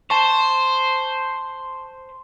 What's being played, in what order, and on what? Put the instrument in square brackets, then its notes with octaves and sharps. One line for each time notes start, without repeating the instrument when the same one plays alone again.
[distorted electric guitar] C5 [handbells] A5 C#6